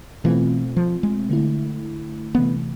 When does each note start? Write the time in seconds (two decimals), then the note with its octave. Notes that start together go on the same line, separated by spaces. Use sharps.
0.24 B2 E3 A3 C4 F4
0.76 F3
1.03 G#3
1.30 D3 A3 E4
2.35 C3 E3 A3 B3